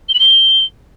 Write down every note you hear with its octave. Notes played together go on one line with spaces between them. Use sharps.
G7
F#7
G7